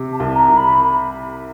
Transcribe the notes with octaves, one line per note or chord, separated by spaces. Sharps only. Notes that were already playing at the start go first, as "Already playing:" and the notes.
Already playing: C3
A5
C2
A#5
C2
B5